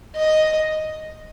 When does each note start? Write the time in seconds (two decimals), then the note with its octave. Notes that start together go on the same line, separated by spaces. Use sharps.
0.16 D#5